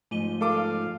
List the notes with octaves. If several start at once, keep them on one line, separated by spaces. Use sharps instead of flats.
G#2 F3 A3 D#7 G7
A4 F5 D6